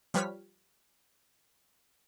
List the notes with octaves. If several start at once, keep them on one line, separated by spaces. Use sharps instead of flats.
F3 G3 B4 C#5 F6 B6